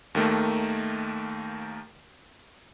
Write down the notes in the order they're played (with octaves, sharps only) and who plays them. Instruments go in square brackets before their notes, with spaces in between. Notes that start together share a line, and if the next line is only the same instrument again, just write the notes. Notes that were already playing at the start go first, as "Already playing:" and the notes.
[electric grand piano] D#2 D#3 A3 A#3